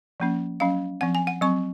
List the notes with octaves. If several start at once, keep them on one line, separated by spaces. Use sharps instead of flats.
F3 A#3 C#4
F#3 C#4 F5
F3 C4 F#5
G#5
F#5
F#3 C4 C#6